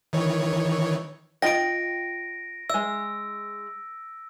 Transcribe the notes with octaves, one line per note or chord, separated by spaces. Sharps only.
D#3 E3 C#5
F4 D#5 G5 A#6 D7
G#3 E5 E6